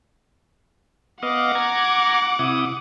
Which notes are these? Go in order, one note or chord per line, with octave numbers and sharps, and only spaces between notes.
B3 D#5 F5 F#5 D6
A#5 G#6
C3 E4 D#6